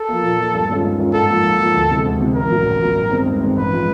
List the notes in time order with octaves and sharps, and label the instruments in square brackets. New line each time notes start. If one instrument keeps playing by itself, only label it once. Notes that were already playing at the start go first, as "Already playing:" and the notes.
Already playing: [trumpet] A4
[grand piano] F3 A#3
A#2
F3 A#3
G2
D#3 G#3 C#4 F4
G2
D#3 G#3 C#4 F4
[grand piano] G#2 [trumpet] A4
[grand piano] F3 A#3
G#2
F3 A#3
D2
C3 E3 G#3
D2
C3 E3 G#3
[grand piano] A1 [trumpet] A#4
[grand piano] A2 F#3
A1
A2
F#3
G2
D#3 G#3 C4
G2
D#3 G#3 C4
[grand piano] A1 [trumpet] B4
[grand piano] F3 G#3